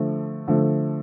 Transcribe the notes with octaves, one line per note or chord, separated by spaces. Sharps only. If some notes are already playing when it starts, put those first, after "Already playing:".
Already playing: D3 F3 A3
D3 F3 A3